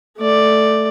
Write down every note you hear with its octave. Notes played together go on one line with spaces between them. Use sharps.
A3 D5